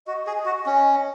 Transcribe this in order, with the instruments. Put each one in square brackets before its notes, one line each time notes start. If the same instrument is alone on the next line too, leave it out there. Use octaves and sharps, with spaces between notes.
[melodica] F#4 [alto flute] D#5
[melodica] G#4
F#4
C#4